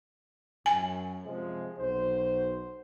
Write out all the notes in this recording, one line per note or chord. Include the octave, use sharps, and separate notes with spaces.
F#2 G#5
C3 F3 G#3
B1 F#4 C5